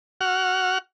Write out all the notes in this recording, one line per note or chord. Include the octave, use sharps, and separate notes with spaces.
F#4 F#5 F6